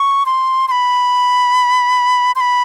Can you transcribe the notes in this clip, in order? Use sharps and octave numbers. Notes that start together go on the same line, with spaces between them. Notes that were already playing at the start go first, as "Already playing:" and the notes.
Already playing: C#6
C6
C6
B5
C6
B5